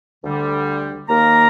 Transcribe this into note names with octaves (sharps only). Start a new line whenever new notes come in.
D2 D3 G3
D#2 D#3 A#3 A#4 A#5